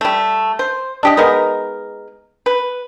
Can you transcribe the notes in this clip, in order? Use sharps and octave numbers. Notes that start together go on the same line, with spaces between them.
G3 A3
C5
D4 G4 D#5
G#3 B3 D#4 A#4
B4